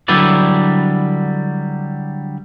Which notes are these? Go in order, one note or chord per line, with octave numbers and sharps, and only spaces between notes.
D3 F#3 G3 E4 B4 D5